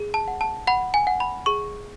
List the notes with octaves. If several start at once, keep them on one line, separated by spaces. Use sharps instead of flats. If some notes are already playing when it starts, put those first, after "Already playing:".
Already playing: G#4
A5
F#5
A5
F#5 B5
G#5
F#5
B5
G#4 C#6